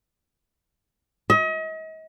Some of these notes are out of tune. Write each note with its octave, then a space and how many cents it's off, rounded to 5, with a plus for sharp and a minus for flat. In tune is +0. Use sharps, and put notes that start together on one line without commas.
D#5 +40